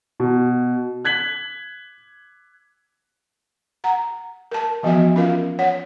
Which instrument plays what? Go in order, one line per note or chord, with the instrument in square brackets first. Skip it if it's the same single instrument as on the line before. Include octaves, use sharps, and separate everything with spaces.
[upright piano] B2
F#6 G#6 B6 F#7
[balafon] F#5 A#5
A#4 A5
E3 F3 B3 F#4 E5
C#4 F4 A#4 F5
C#5 F#5